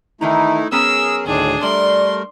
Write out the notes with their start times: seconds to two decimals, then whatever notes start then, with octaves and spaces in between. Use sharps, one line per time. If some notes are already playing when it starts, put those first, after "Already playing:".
0.21 D#3 E3 A3 D#4 E4 A#5
0.72 F#3 B3 C#4 G#4 A#4 E6
1.26 D2 A2 D#3 D4 G#4
1.63 G3 A3 A#4 D5 C6